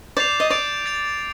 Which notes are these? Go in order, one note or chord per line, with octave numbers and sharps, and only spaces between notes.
D5 D6 G6 C7 F7
D#5
D5 A6 D7 F7
A6 D7 F7